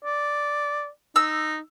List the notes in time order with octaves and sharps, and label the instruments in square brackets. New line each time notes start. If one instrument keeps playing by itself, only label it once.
[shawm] D5
[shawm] D#4 [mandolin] E6